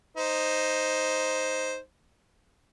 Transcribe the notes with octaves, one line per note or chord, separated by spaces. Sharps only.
D#4 C5